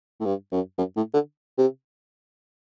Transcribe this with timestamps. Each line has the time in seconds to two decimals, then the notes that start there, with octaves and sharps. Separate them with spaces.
0.20 A2
0.26 G2
0.52 F#2
0.78 F#2
0.96 A2
1.14 D3
1.58 C3